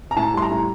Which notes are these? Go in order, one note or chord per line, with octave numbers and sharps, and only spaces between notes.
A#5
A2 A5
G3 C6
A#5
A2